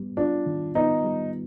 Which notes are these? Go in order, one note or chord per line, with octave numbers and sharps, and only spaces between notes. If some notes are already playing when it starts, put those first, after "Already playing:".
Already playing: G3 B3
D4 F4
D#3
B3 D#4
G3